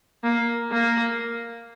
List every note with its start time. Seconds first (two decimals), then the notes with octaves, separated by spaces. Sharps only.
0.24 A#3
0.71 A#3